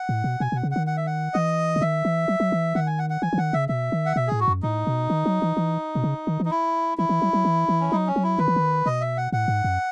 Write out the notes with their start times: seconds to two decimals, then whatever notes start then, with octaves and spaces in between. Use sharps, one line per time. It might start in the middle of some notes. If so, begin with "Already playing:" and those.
Already playing: F#5
0.09 A2
0.24 B2
0.40 B2 G#5
0.52 B2 F#5
0.63 C#3
0.71 D#3 F#5
0.87 F#5
0.97 E5
1.07 F#5
1.34 E3 D#5
1.76 C#3
1.81 D#3 E5
2.05 E3
2.28 F#3
2.40 F#3
2.52 E3
2.75 D#3 F#5
2.87 G#5
2.99 F#5
3.10 F#5
3.22 E3 G#5
3.33 E3
3.38 D#3 F#5
3.53 C#3 E5
3.69 B2 E5
3.92 D#3
4.06 F#5
4.16 B2 E5
4.27 A2 G#4
4.40 F#4
4.48 F#2
4.63 A2 D#4
4.87 B2
5.10 D#3
5.26 F#3
5.42 E3
5.57 E3
5.95 B2
6.04 C#3
6.27 D#3
6.40 E3
6.45 D#4
6.51 E4
6.98 E3 E4
7.09 E3
7.22 F#3
7.33 F#3
7.45 E3
7.69 E3
7.81 C#4
7.92 F#3 D#4
8.07 C#4
8.16 F#3
8.23 E4
8.39 D#3 B4
8.48 E3
8.56 D#3
8.86 B2 D#5
9.01 E5
9.17 F#5
9.32 A2 F#5
9.48 G#2
9.64 F#2